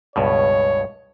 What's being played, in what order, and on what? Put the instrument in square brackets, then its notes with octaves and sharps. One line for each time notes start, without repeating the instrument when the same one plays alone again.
[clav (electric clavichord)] C#2 G2 B2 [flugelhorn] C#5